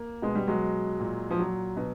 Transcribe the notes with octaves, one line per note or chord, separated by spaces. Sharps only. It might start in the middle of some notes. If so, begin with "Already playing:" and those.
Already playing: A#3
B2 G#3
G3
F#3 G#3
A#2
F3
F#3
B2